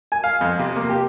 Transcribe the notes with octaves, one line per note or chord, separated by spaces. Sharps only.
G#5
F5
F2
C3
A#3
G4